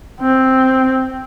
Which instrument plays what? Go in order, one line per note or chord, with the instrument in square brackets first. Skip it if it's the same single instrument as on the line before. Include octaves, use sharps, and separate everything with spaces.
[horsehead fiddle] C4